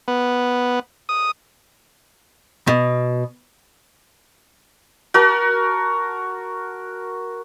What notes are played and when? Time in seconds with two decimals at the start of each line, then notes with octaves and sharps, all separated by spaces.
0.08 B3
1.09 D#6
2.67 B2
5.14 F#4 A#4 A5